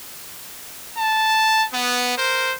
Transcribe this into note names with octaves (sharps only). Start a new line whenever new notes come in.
A5
B3
A#4 C5